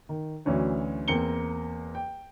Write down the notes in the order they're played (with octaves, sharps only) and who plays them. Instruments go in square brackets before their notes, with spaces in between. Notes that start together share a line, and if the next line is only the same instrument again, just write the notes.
[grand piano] D#3
D2 E3 F#3 C#4 D4
E2 A#3 C4 A#5 C#7 G7
G5